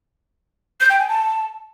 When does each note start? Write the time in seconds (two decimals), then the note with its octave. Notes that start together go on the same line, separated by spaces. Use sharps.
0.80 G6
0.90 G5
0.99 G#5
1.08 A5